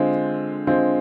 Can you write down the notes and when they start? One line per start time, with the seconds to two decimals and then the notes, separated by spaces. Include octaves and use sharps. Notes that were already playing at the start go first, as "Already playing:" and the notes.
Already playing: D3 G#3 C4 F4
0.67 D3 G#3 C4 F4